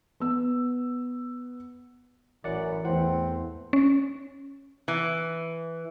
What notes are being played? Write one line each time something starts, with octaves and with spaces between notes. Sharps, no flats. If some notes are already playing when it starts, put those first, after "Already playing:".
B3 E6
A1 F#2 E3 D5 F#5
E2 E3 A3 C4 F#5
C#4
E3